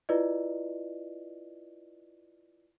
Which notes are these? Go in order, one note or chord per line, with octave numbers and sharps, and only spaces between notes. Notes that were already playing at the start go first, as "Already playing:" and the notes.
E4 F4 B4 D5 D#5